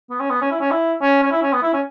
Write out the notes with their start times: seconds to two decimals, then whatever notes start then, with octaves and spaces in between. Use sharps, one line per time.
0.10 B3
0.20 C#4
0.30 B3
0.42 C#4
0.51 E4
0.61 C#4
0.71 E4
1.02 C#4
1.23 C#4
1.32 E4
1.43 C#4
1.53 B3
1.63 E4
1.73 C#4